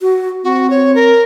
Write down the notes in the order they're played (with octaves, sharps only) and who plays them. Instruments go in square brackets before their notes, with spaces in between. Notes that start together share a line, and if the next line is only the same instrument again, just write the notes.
[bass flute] F#4
[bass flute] C4 [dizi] F#4
[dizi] C#5
A#4